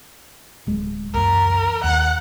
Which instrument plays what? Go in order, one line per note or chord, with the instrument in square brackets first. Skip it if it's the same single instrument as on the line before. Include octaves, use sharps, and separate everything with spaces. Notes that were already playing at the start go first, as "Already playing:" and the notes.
[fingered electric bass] D1 G#3
[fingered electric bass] C#2 F#2 E3 [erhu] A#4
[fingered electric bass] D#2 [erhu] F#5